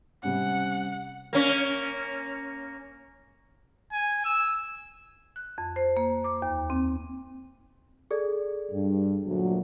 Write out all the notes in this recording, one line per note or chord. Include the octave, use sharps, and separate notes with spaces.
C3 G3 C#4 F#5
A#3 C#4
G#5
E6
F#6
F2
C5
A#3
D6
D#2
C4
G#4 A4 D5
G2
D2 A#2 F#3